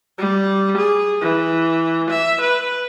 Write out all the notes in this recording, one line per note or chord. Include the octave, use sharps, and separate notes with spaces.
G3
G#4
E3
E5
B4